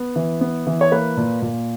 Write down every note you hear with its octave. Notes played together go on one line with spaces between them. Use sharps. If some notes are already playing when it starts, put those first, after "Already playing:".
Already playing: B3
E3
B3
E3
C#5
A#3 B4
A#2
A#2